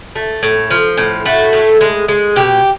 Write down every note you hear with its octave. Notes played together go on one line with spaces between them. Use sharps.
A3
A2
F3
A2
A3 F#4
A2
G#3
G#3
B2 G4